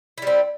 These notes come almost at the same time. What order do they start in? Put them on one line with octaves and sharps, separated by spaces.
E4 G3 C4